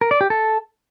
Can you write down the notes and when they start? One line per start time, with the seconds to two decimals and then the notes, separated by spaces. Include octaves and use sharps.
0.01 A#4
0.11 D5
0.21 G4
0.30 A4